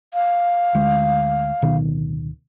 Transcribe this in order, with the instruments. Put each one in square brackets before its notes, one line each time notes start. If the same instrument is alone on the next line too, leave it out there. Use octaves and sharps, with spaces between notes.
[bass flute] F5
[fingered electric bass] D2 G#3
D1 B2 D#3